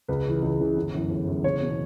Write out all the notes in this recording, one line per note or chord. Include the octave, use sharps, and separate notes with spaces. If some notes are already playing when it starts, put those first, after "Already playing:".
C#2 B4
C#3 E3
C#2
C#3 E3
G1
F#2 E3
G1
F#2 E3
F#1 C#5
E2 B2